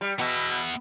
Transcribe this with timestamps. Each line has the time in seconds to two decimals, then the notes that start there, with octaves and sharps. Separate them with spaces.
0.01 G3
0.19 B2 B3 E5